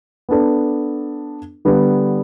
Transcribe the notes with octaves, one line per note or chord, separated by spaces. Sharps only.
B3 D4 A4
D3 G3 B3